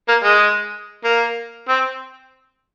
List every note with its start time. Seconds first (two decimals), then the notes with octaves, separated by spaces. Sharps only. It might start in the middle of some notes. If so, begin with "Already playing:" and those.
0.08 A#3
0.24 G#3
1.04 A#3
1.68 C4